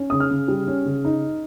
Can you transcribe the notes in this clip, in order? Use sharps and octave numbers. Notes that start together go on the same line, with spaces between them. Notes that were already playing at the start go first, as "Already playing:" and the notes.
Already playing: C#4
C#3 D#6
F6
C#3
G3
C#4
C#3
D#4